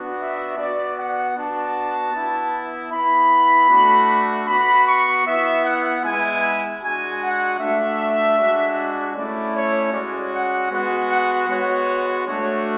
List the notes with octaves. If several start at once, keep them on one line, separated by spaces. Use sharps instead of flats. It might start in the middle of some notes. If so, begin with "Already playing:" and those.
Already playing: B3 D4 F#4
E5
B3 F#4 D5
F#5
B3 D4 F#4 A5
B3 E4
B3 E4 B5
A3 D4 F#4
B3 F#4 B5
C#6
B3 E4 E5
F#5
G#3 B3 E4 G#5
G#3 D4 F#4 G#5
F#5
A3 D4 F#4 E5
G#3 D4 F#4
A3 C#4 E4 D5
C#5
G#3 C#4 F#4 D5
F#5
G#3 B3 F#4 F#5
F#5
G#3 B3 F#4 C#5
A3 D4 F#4 C#5